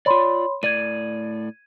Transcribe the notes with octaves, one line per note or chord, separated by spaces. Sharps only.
F4 C#5 D5 B5 C6
A2 D5 G#6 D#7